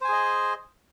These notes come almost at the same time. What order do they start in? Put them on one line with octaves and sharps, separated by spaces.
C5 G#5 G#4 D#5